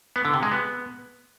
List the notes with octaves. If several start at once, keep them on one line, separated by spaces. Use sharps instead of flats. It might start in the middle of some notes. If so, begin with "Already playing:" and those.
B3
D3
C3
G#3
B3